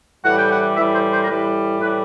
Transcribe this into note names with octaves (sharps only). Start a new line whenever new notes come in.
A2 E3 G3 F#5
G5
F#5
A2 E3 G3 E5
C5
C5
A#4
A2 E3 G3 B4
A2 E3 G3 B4